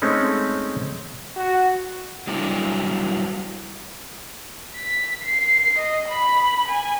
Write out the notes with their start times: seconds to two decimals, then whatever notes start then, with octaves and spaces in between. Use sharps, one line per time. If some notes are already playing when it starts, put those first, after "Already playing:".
0.02 G#3 A3 C4 C#4 D#4
1.36 F#4
2.27 F#3 G3 D4 E4
4.76 B6
5.23 C7
5.78 D#5
6.08 B5
6.68 G#5